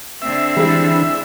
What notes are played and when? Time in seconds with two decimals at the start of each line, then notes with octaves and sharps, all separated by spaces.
0.22 D3 C4 E5
0.57 E3 G3 G#3 D4 E4